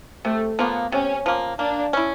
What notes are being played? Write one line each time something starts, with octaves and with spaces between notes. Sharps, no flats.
C3 A3
F3 A#3 B3
C3 C#4
F3 A#3
A#3 D4
C#4 E4